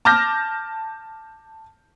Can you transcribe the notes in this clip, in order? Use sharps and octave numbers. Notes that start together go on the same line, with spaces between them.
A5 D6 F6 G6 A#6